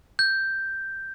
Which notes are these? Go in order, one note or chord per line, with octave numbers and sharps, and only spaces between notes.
G6